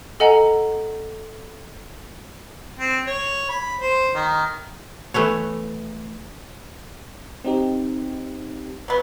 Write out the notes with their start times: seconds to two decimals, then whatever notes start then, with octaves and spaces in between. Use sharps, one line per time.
0.20 A4 D#5 F#5 G#5 A#5
2.79 C4
3.07 C#5
3.49 B5
3.80 C5
4.15 D#3
5.14 E3 A3 B3 C#5
7.45 C4 D#4 G4
8.88 F#3 B3